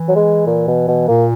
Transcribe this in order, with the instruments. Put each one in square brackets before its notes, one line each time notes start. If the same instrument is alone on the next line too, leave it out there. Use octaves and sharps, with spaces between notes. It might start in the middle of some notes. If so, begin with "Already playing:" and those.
Already playing: [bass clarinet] E3
[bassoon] F#3
G#3
A#2
B2
B2
[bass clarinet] A#2 [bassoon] A#3